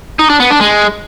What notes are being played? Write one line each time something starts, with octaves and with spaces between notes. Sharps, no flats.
D#4
D4
B3
D4
G#3